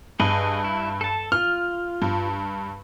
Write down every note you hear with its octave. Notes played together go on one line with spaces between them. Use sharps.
G2 G#4 B4 D#5
E4
A4 A5
F4 F6
G2